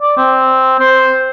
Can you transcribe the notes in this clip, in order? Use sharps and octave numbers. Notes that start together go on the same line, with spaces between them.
D5
C4
C5